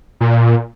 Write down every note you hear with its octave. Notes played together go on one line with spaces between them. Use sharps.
A#2